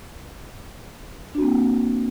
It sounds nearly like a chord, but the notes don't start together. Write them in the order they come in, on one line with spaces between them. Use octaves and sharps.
D4 F#4 C4 A#3